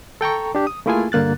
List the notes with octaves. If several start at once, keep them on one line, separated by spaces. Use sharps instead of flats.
A4 G5 A#5 C#6
D4 G4
D#6
A3 A#3 E4 F4 G#4 G#5
G2 D3 A#3 F#6 A6